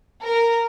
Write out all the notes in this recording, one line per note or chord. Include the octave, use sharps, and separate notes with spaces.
A#4